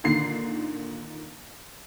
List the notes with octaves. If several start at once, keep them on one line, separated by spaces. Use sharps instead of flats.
A#2 D3 D#3 C7